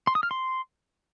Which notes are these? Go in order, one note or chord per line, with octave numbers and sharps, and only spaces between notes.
C6
D#6
F6
C6